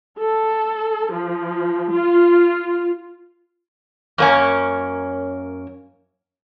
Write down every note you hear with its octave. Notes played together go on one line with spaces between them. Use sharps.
A4
F3
F4
F#2 A#3 C#4